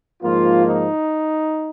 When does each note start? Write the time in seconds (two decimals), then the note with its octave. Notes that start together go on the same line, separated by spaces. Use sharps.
0.23 G#2 F3 A#3 F4
0.64 D#4